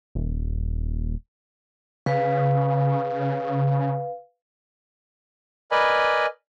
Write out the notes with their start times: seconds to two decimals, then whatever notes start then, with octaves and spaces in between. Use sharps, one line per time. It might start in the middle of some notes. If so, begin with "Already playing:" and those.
0.15 D#1
2.06 C#3 B4 F5
5.71 A#4 B4 D5 D#5 G#5 B5